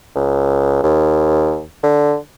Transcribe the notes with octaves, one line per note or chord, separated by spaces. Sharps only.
C#2
D#2
D3